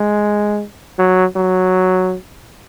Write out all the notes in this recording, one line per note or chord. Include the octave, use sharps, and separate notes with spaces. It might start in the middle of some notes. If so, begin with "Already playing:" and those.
Already playing: G#3
F#3
F#3